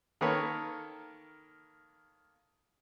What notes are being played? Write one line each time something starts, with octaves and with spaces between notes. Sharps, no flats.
D#3 A#3 A4 B4 C#5